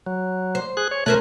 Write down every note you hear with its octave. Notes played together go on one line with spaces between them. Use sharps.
F#3
C5
G#4 F#6
C#5
B2 A3 C#4 A#4 C5 F#6